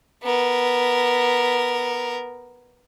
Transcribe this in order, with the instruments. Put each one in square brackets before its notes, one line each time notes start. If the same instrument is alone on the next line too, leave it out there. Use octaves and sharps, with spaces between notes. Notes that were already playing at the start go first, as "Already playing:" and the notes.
[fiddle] B3 A#4